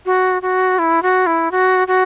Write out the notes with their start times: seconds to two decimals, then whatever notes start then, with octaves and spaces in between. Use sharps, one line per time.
0.06 F#4
0.42 F#4
0.79 E4
1.03 F#4
1.26 E4
1.51 F#4
1.88 F#4